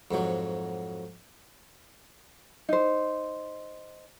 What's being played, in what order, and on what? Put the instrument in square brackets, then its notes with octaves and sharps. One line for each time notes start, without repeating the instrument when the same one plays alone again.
[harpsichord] F2 G#2 F#3
[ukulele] D#4 C5